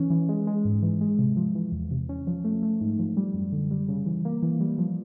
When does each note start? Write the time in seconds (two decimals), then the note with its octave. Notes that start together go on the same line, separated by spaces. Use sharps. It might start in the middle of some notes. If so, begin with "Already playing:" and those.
Already playing: E3 C#4
0.10 E3
0.29 G#3
0.47 G#3
0.65 G#2
0.83 E3
1.01 G#3
1.19 C3
1.36 F3
1.55 E3
1.72 E2
1.91 C3
2.09 C#4
2.27 F3
2.44 A3
2.63 A3
2.81 G#2
2.99 F3
3.17 G3
3.34 F#2
3.52 D3
3.71 G3
3.88 C#3
4.06 E3
4.25 A#3
4.42 E3
4.60 G3
4.78 F3